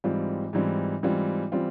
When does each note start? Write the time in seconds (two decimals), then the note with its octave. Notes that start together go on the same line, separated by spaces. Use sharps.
0.04 G#2 E3 G3 C4 F4
0.53 G#2 E3 G3 C4 F4
1.03 G#2 E3 G3 C4 F4
1.52 E3 G3 C4 F4